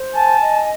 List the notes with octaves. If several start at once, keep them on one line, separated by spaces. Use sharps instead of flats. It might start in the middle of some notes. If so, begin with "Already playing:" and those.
Already playing: C5
G#5 A5
D#5